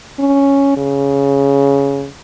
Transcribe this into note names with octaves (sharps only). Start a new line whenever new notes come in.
C#4
C#3